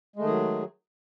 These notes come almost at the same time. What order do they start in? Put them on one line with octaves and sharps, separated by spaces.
G#3 A3 D#3 G#4 F#3